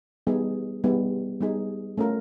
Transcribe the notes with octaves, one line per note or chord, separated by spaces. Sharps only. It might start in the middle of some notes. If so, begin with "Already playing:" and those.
G3 B3 D#4 G#4
G3 B3 D#4 G#4
G3 B3 D#4 G#4
A3 C#4 F4 A#4